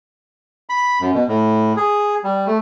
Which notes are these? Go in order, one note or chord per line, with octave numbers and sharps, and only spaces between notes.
B5
F#2
B2
A2
G#4
G3
A3